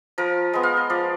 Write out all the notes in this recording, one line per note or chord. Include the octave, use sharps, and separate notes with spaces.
F3 A#4
G#3 B3
F5
D#5
F3 D5